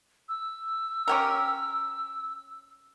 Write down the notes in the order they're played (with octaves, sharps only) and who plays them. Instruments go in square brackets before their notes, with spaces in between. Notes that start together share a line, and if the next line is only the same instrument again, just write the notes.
[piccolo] E6
[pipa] C#4 G4 A#4